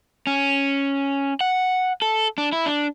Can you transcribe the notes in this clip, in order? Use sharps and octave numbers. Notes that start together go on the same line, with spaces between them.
C#4
F#5
A4
D4
E4
D4